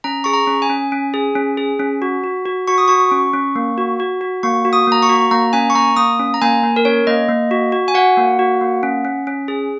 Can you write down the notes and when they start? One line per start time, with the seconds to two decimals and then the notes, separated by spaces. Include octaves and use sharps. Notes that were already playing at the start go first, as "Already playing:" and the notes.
0.04 C#4 A#5
0.24 G#4 C#6
0.34 A#5
0.47 C#4
0.62 G#5
0.69 C#4
0.92 C#4
1.14 G#4
1.36 C#4
1.58 G#4
1.79 C#4
2.02 F#4
2.24 F#4
2.46 F#4
2.68 F#4 C#6
2.78 D#6
2.88 F#4 C#6
3.12 C#4
3.33 C#4
3.56 A#3
3.78 F#4
4.00 F#4
4.21 F#4
4.43 A#3 C#6
4.65 F#4
4.73 D#6
4.87 A#3 A#5
5.02 C#6
5.09 F#4
5.31 A#3 A#5
5.53 C#4 G#5
5.70 C#6
5.75 A#3 A#5
5.96 A#3 D#6
6.19 C#4
6.34 A#5
6.42 A#3 G#5
6.63 A#3
6.76 A#4
6.85 C#4 C#5
7.07 A#3 D#5
7.29 A#3
7.51 F#4
7.72 F#4
7.88 G#5
7.94 F#4 F#5
8.17 A#3
8.39 F#4
8.61 A#3
8.83 C#4
9.05 C#4
9.27 C#4
9.48 G#4